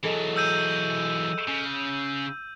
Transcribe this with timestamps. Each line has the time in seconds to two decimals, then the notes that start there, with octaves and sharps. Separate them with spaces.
0.03 E3 F#3 G#4 A4 D#5
0.36 E6 G6 D#7
1.48 C#3